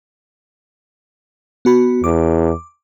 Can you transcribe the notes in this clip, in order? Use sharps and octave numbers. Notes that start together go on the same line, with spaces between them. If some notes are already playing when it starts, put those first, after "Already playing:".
B3 F#4 B5
E2 D6